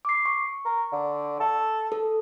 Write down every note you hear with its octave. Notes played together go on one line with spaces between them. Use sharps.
D6 C7
C#6
A#4
D3
A4
A4